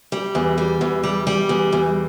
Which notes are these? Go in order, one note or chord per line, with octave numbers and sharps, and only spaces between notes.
G3
E2
G3
E2
G3
G3
E2
E2